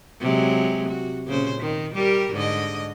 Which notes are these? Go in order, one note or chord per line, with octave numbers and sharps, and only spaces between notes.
C3 F#3 G#3
F#4
A#2 C#3 C5
D#3
G3 G4 A#4
G#2 D3 D#5